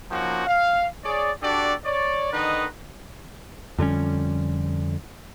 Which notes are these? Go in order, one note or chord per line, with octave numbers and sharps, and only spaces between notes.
F3 A#3 C#4 D#4 F#4
F5
G#4 C#5 D5
D4 F#4 G4 A4 D5
C#5 D5
D3 D#3 D#4 B4 D#5
F2 D3 G3 C#4